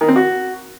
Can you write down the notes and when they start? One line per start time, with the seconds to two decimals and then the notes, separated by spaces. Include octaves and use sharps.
0.01 D#3
0.08 C4
0.16 F#4